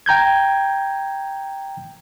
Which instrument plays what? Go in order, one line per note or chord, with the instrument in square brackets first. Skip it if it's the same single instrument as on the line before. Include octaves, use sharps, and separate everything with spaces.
[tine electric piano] G5 A#5 G6 G#6